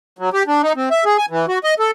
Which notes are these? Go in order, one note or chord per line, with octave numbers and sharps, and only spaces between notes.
F#3
G4
D4
D#4
C4
E5
G#4
G#5
E3
F#4
D#5
A4